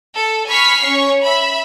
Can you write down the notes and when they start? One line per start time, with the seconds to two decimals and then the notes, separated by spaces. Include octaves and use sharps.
0.16 A4
0.48 G#5 B5 C#6 F6 B6 C7
0.83 C#4 C#5 C#6
1.22 E5 B5